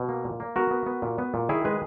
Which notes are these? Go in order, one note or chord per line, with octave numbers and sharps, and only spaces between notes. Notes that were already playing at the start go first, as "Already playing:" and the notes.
Already playing: B2
A#3
A#2
A#3
B3 F#4 A#4
B3
B3
A#2
B3
A#2
D#3 E4 G#4
G#3 G#4 B4